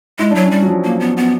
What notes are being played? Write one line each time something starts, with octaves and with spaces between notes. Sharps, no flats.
G#3 E4
D4
F#3
C#4
G3
F#3
F3
A#3
B3
B3